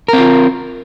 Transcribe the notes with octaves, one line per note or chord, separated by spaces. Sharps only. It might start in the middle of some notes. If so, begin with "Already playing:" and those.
C4 F4 A#4